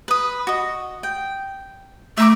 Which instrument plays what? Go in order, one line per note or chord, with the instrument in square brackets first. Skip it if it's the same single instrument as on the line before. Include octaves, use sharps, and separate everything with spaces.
[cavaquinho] B4 D#6
F#4 D#5
G5
[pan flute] A3 [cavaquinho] E5 A#5 D6